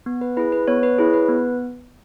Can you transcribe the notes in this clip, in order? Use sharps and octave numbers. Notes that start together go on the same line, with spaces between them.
B3
B4
E4 G#4 B4
B4
B3 C#5
B4
E4 G#4 C#5
B4
B3